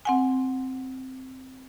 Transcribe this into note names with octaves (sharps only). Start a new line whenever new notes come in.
C4 F#5 G#5